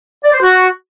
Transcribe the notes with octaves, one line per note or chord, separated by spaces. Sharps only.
D5
C5
F#4